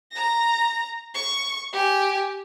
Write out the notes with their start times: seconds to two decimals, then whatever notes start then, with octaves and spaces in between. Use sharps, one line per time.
0.11 A#5 A#6
1.14 C#6
1.73 G4 G#5